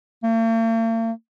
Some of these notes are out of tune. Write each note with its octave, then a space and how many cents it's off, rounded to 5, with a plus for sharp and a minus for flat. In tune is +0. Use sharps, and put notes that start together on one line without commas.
A#3 -45